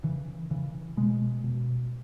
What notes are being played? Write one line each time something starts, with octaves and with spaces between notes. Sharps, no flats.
C#3 E3
C#3 E3
B2 G#3
B2